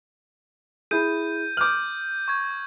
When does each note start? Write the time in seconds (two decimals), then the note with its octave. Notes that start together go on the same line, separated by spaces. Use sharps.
0.91 E4 G#4 G6 D#7
1.57 D6 D#6 F6 G6 F#7
2.28 C#6 G#6